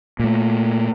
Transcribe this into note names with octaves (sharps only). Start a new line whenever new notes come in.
A#2 A3